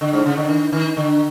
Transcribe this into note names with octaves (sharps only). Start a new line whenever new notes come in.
D3
G#2
C#3
D3
D#3
D#3
D3